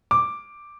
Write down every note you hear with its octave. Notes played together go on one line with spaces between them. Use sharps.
D6